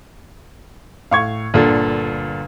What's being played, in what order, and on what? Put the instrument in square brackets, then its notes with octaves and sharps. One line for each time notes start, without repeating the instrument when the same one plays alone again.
[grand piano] A2 C#6 G#6 [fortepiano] F5
[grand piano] G1 [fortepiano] A#2 D3